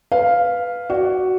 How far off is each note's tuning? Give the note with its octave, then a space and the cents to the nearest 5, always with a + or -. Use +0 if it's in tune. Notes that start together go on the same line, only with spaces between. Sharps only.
B4 +0 F5 +0
F#4 +5 D5 +0